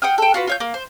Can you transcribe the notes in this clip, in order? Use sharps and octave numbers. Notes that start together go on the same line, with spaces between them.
F#5 G5 D#6 F6
A4 G5
F4 F#4 B4
F4 C#5 G6
A#3
C5